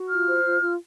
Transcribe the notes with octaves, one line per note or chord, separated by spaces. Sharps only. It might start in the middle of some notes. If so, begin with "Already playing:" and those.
Already playing: F#4
F4 F6
C5
F4
F4